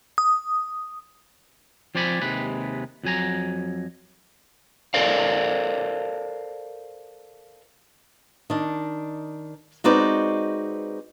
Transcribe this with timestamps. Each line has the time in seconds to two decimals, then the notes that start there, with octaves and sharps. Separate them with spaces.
0.18 D#6
1.95 F3 C4 C5 D5 G#5 B5
2.22 D#2 C3 G#3 B4
3.04 F2 F#3 G#5 A#5
4.94 A4 A#4 C5 D5 F5
8.50 D#3 D4
9.84 G#3 C4 D#4 F#4 B4 D5